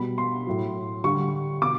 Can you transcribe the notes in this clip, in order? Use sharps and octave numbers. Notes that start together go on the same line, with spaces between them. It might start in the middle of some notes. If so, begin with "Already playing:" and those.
Already playing: B2 G3 B5
C6
A2 F#3
D3 G3 C#6
B2 D6